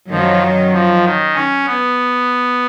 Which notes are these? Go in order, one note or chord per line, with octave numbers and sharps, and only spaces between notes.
F#2 D#3 F3 F#3
F3
D#3
C#4
B3